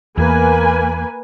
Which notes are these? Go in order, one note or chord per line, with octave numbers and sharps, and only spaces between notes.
E2 A#3 B4 G#5